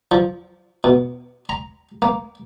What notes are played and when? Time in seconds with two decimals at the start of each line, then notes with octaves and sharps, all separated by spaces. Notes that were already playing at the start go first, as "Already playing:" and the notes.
0.12 F3
0.84 B2
1.49 A#5
2.02 A#3